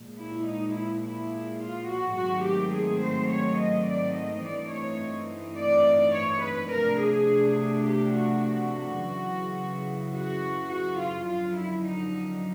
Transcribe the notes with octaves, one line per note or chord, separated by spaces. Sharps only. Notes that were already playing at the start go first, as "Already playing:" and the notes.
Already playing: A#2 F3 G#3
E4
D#4
E4
E4
F4
F#4
G#2 D#3 F#3 A3 C4 F#4
G4
G#4
C5
C#5
D#5
D5
D#5
G2 E3 A3 C4 D#4 D5
C#5
D5
C#5
B4
C3 F3 A3 D4 A#4
G#4
G4
F#4
F#4
F#2 C#3 E3
F#4
F#4
F4
F#2 D3 F3 F4
E4
D#4